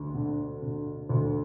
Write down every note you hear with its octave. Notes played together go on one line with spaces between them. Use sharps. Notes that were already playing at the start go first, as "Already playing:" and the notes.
Already playing: D2
D3
D3
D2